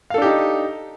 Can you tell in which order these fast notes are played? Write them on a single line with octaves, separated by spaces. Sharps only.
F5 A4 D4 G4 D#4